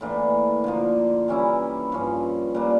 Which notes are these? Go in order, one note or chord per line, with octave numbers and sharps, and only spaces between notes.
A2 E3 A#3 D4
D3 F3 A#3
E3 G3 C#4 E4
G2 F3 C#4
A#2 G3 A#3 D4